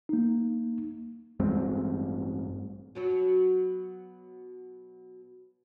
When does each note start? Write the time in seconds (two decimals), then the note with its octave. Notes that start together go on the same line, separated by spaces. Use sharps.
0.09 A#3 D#4
1.40 A1 G2 G#3 C4
2.95 B2 F#3 F#4